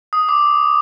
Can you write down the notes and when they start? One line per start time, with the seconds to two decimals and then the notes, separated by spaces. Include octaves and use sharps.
0.13 D#6
0.29 D6